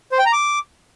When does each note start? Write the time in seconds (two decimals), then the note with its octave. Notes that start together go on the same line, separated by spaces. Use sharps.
0.12 C5
0.19 G5
0.26 A#5
0.33 D6